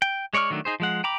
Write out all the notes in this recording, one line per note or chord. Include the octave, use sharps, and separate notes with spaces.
G5
G#3 C#5 D5 C#6 F6
D#3 F#3 A3 D4
D#4 G#4 C5
F3 G#3 F#5
G5 A#5 B5 D6